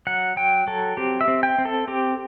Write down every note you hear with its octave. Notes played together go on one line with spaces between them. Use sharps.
F#3 F#5
F#3 G5
F#3 A4
C4 G4
E5
C4
G5
C4
A4
C4 G4